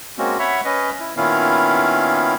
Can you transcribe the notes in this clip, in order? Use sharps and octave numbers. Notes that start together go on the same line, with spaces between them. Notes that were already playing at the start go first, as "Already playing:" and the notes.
G#3 A#3 C4 C#4 F#4
C#5 E5 F#5 B5
C#4 B4 D#5
E4
A#2 D#3 B3 C#4 E4 F5